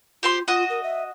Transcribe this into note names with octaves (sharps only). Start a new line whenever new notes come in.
F4 G4 C5 C6
F4 F#4 D#5
A#4
E5